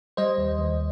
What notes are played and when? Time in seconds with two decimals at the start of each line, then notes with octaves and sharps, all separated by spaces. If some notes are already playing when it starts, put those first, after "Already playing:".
0.17 G3 C5 D#5
0.38 D#2
0.59 D#2